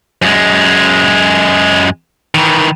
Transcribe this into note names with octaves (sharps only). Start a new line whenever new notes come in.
F#2 G#3
D#3 E3